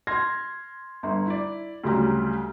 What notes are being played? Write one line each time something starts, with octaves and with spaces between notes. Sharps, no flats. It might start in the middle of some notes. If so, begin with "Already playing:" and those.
C6 F6 G#6 A#6
G1
E4 D5
D2 C#3 F#3 G3 A#5